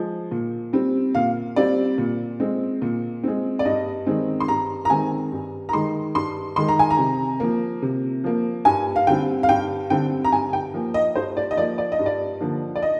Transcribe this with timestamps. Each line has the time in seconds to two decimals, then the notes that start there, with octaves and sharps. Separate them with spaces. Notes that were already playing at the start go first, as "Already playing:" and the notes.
Already playing: F3 G#3
0.31 A#2
0.73 G3 C4
1.15 A#2 F5
1.56 G3 C4 D5
1.98 A#2
2.40 G#3 C4
2.82 A#2
3.23 G#3 C4
3.59 D5
3.65 G2 D#5
4.07 D#3 G#3 C4
4.40 C6
4.48 G2 A#5
4.85 A#5
4.90 D#3 G#3 C4 G#5
5.32 G2
5.69 A#5
5.73 D#3 G#3 C6
6.15 G2 C6
6.56 D#3 G#3 C6
6.68 A#5
6.79 G#5
6.91 A#5
6.98 C3
7.40 F3 A#3
7.82 C3
8.24 F3 A#3
8.65 G2 G#5
8.96 F5
9.07 D3 G3 C4 G5
9.43 F5
9.49 G2 G5
9.90 D3 G3 C4 G5
10.25 A#5
10.32 G2 G#5
10.53 G5
10.74 F3 A#3
10.94 D#5
11.16 G2 C5
11.37 D5
11.51 D#5
11.57 F3 A#3 D5
11.78 D5
11.92 D#5
11.99 G2
12.06 D5
12.41 D3 F3 A#3
12.76 D5
12.83 D#5